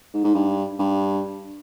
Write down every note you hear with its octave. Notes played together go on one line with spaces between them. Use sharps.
G#2
G#2
G2
G2